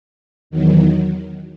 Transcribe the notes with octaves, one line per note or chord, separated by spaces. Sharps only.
E2 D#3 F#3